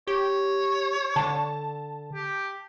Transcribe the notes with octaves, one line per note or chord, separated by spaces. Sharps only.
G4 C#5
D3 A5
G4